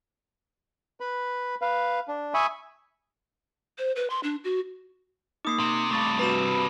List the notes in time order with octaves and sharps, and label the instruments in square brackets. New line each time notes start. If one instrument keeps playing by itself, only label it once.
[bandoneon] B4 B5
B4 F5
D4
E5 G#5 B5 C#6 D#6
[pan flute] C5
B4
C6
D4
F#4
[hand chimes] A#3 D#4 [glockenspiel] D6 D#6 C7
[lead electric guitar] C3
[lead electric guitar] G2 C3 [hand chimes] A3 C#6 A6
[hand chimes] F#4 B4 [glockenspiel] A#5 B5 E7